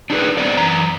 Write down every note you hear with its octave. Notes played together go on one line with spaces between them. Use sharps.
D4 D#4 G#4 A#4 B4
A3 B3 C4 C5 D5 D#5
F#2 E3 A#5